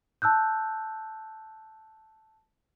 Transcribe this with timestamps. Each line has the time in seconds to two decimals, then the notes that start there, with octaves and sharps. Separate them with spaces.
0.22 A5 E6 F#6 G6